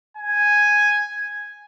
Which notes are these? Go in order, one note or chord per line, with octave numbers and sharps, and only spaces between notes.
G#5